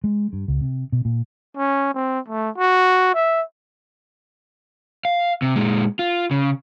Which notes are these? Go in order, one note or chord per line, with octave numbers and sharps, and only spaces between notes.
G#3
G2
C#2
C3
B2
A#2
C#4
C4
A3
F#4
E5
F5
C3
A#2 G#3
F4
C#3